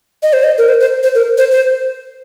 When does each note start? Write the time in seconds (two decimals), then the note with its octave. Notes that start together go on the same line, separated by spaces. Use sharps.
0.23 D#5
0.33 C5
0.43 D#5
0.58 A#4
0.69 C5
0.80 C5
1.03 C5
1.15 A#4
1.38 C5
1.51 C5